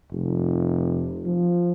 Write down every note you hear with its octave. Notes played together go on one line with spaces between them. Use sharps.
F1
F3